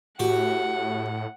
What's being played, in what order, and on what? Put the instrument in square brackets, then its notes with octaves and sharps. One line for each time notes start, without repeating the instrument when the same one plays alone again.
[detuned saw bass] A2 [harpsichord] F#4 G4 [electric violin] F#5